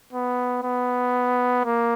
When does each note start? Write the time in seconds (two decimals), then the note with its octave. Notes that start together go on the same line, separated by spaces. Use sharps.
0.13 B3
0.63 B3
1.65 A#3